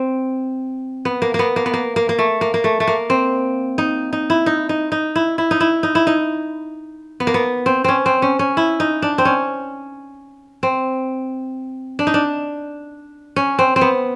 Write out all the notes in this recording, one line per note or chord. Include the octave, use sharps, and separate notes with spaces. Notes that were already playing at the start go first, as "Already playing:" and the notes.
Already playing: C4
B3
A#3
A#3 B3
A#3
B3
A#3
A#3
A#3
A3
A#3
A#3
A3
A3
A#3
C4
D#4
D#4
E4
D#4
D#4
D#4
E4
E4
D#4
E4
D#4
E4
D#4
B3
A#3
B3
C4
C4 C#4
C4
C#4
C#4
E4
D#4
D4
C4
C#4
C4
D4
D#4
D4
C#4
C4
C4
B3